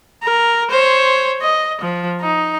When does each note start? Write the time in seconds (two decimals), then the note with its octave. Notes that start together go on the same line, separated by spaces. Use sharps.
0.24 A#4
0.71 C5 C#5
1.41 D#5
1.81 F3
2.21 D#4